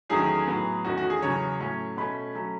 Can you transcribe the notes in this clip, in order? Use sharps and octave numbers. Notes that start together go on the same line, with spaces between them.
E2 D#3 F#3 A3 C#4 G#4
A2 F#3 B3
E2 D#3 A3 C#4 F#4
F#4
G#4
E2 C#3 F#3 C#5
A2 F#3 A3 C#4
B2 A3 C#4 B5
F#3 A3 C#4